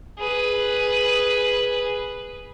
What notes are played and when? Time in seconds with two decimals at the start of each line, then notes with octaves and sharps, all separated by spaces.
0.19 G#4 B4